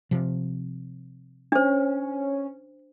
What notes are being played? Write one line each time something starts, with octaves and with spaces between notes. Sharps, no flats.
C3 F3
C#4 D4 C5